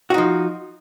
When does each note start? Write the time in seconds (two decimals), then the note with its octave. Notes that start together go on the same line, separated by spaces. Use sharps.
0.10 F#4
0.14 D#4
0.18 F3